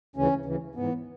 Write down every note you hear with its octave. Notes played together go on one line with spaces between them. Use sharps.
D2 C#3 E3 C#4
D2 C#3 E3
G#2 E3 B3